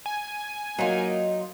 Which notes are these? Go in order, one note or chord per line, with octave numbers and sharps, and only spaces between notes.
G#5
F#3 A#3 D#4 F4